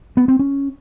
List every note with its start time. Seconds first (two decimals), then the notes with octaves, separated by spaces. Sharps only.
0.17 B3
0.28 C4
0.39 C#4